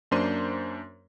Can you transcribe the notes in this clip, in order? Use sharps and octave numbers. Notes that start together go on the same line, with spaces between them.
F#2 A#3 D4 C5 C6 D#7